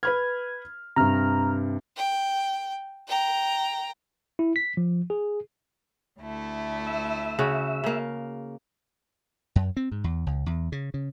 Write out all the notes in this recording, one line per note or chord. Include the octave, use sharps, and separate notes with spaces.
B4 B5 F6 G#6
G2 C3 A#5 F6
G5
G5 A#5
E4
B6
F3
G#4
D2 A3 E4
E5
C#3 F#4
C#3 A#3
F#2
C4
G#2
E2
C#2
E2
C#3
C#3